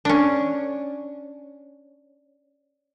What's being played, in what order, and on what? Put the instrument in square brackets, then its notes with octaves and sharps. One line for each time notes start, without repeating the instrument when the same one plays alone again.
[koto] C#4 D4